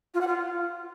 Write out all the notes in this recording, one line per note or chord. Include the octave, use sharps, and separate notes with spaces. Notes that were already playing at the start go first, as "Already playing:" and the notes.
F4
F#5
F4